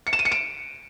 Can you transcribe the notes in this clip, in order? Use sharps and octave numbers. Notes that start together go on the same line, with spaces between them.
C#7
E7
D#7
C#7
D7